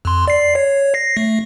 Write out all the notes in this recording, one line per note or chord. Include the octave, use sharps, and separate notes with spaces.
F2 C6
D5 C7
C#5
A#6 C7
A3